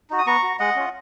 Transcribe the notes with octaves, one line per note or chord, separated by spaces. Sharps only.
D#4 F#4
D#6
B3 A#5 C#6
F#4
G#3 D#5 F#5
C#4 F4